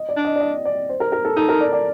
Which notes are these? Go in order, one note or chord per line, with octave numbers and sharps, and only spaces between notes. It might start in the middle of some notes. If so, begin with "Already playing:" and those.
Already playing: D#5
D5
D4
D#5
D5
D#5
D5
C5
A#4
A#4
A4
D#4 A4
A#4
D5
D5